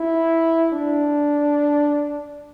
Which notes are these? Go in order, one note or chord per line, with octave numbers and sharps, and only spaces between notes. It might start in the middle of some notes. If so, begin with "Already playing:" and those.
Already playing: E4
D4